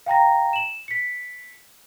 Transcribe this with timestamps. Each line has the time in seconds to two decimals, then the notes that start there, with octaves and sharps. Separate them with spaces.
0.06 F5 G5 A#5 A#6
0.53 E7 F#7
0.88 B6 C#7